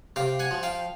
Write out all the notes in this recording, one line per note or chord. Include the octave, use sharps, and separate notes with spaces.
C3 F5 G5
F#5 G#5
F3
F5 G5